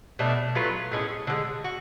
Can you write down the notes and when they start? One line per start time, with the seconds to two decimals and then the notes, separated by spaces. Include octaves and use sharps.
0.19 B2 A3 D4
0.55 F#3 A3 F4 B4
0.91 A2 G#3 C#4
1.27 D3 F3 G#3
1.64 F#4